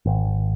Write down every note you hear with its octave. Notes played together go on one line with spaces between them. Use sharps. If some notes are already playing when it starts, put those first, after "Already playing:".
G#1